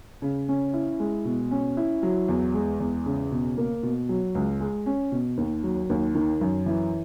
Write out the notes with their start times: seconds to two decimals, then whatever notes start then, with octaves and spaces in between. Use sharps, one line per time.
0.22 C#3
0.48 C#4
0.73 E4
1.00 G#3
1.25 B2
1.51 C#4
1.77 E4
2.03 F#3
2.29 E2
2.54 G#3
2.80 E2
3.06 C#3
3.31 B2
3.57 A#3
3.83 B2
4.09 F#3
4.35 C#2
4.60 G#3
4.86 C#4
5.12 B2
5.37 D#2
5.63 F#3
5.90 D#2
6.15 D#3
6.41 F#2
6.66 E3